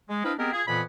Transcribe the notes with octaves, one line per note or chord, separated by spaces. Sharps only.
G#3
C4 D4 E4 B4 D#5 F5
G#3 B3 C4 G4 G#4 A#4
F4 G#4
F2 A#2 E3 B3 G#5 B5